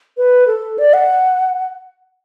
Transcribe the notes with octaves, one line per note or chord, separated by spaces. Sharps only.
B4
A4
D5
F#5